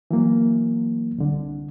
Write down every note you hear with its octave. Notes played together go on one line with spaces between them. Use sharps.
E3 F#3 A#3
C2 D3